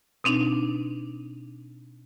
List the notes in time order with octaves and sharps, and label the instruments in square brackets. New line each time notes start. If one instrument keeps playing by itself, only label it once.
[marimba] B2 C4 D4 D#4